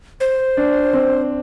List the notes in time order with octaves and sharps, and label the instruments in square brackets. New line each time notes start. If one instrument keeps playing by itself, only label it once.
[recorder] C5
[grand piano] D4
C4